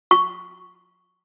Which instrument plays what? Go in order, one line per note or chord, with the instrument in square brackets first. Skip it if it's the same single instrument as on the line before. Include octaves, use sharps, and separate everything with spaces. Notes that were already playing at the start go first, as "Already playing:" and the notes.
[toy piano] C#6